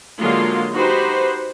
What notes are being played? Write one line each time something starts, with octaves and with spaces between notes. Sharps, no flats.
D3 F#3 G#3 A#3 F4 C6
D#4 F#4 G4 B4 C5